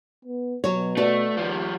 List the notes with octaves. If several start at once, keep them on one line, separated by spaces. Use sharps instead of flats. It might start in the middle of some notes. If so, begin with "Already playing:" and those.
B3
B2 F#3 C#5
A3 F#4 B4 D5
D#2 F3 G3